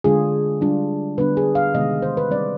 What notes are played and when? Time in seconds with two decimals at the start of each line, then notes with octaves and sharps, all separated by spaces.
0.04 D3 G#3 D4 F4 G#4
0.61 G3 D4 F4
1.18 D3 G3 B3 D4 B4
1.37 G#4
1.55 F5
1.74 C3 D#3 G#3 B3 D#5
2.02 C5
2.17 B4
2.30 G3 C4 D#4 D5